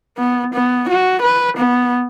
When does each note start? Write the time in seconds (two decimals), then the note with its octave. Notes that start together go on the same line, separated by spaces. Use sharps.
0.18 B3
0.54 B3
0.89 F#4
1.22 B4
1.57 B3